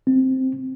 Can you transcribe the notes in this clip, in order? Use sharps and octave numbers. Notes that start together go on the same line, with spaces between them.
C4